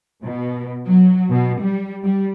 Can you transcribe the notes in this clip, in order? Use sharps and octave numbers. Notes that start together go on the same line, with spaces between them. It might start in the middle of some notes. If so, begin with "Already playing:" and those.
B2
F#3
B2
G3
G3